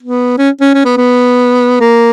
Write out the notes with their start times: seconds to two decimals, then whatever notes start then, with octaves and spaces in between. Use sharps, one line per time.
0.02 B3
0.38 C#4
0.61 C#4
0.74 C#4
0.85 B3
0.97 B3
1.80 A#3